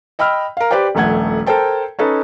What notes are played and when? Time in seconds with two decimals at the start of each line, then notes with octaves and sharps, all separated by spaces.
0.19 D#5 G5 B5 E6 F6
0.57 A#4 F5
0.71 G4 B4 C5 D5 G5
0.95 D#1 A#1 A3 F#5 G#6
1.46 A4 A#4 C5 G5 A5
1.99 C#4 D#4 A4 B4